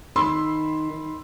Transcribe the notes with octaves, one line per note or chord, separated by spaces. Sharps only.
D#3 B5 C6 E6
D#3